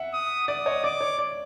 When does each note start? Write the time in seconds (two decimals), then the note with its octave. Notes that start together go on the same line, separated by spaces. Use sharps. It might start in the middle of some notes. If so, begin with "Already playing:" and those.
Already playing: E5 F#5
0.13 D#6
0.48 D5 D#6
0.66 C#5 D#5
0.84 D5 D6
1.01 C#5
1.18 D5